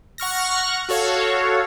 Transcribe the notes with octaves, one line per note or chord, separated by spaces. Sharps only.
F#5 C#6 F6 A#6
F#4 A4 C#5 F5